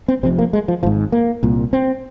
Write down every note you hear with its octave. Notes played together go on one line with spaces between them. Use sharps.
C4
F1 F2 C3 C4
A#3
G#3
F3
G#1 G#2 F3
A#3
C2 A#2
C4